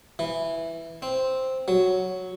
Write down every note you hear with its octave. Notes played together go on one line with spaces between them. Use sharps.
E3
C4
F#3